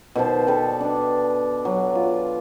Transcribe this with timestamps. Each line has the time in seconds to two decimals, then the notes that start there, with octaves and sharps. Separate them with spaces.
0.15 B2 D#3 C5 A5
0.47 A4 B4 D5 G5
0.81 D4
1.65 F#3
1.95 F4